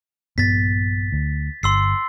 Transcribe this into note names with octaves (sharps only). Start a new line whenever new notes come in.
A#1 G2 B3 A6 B6
D2
G1 C6 E6 C7